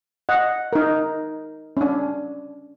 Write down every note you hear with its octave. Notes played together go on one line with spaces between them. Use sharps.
D#5 F#5
D#4 A#4
C#4 D4